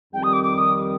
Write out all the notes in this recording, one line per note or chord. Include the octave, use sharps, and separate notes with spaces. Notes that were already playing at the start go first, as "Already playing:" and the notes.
F2 D#3 G3 G5
D#6
D6
D6
D#6